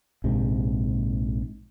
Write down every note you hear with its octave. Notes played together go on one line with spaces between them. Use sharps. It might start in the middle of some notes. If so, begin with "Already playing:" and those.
A#1 G#2 C3